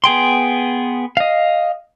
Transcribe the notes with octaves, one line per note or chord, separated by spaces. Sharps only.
B3 G#4 G5 C6
D#5 F5